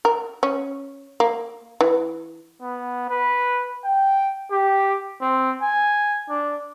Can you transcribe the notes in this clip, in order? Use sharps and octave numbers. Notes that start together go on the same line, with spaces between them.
A#4
C#4
A#3
E3
B3
B4
G5
G4
C4
G#5
D4